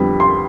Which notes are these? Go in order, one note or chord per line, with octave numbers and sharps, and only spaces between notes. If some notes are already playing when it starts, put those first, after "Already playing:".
Already playing: F2 D3 G3 B3 B5
C6